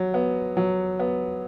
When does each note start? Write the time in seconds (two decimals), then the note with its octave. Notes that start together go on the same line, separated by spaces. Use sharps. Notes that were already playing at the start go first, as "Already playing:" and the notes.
Already playing: F#3
0.14 B3
0.57 F#3
1.00 B3